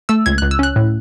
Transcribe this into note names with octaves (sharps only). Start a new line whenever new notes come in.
A3 E6
C#2 G#6
C#2 F#6
E6
C#4 F#6
A2